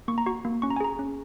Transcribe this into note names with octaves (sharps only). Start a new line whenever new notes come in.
A#3 C#6
A#5
F#4 C#6
A#3
C#4 C#6
A#5
G#5
G#4 A#5
C#4